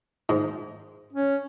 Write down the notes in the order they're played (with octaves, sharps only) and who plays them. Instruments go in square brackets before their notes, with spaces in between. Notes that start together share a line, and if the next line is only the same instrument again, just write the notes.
[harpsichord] G#2
[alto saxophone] C#4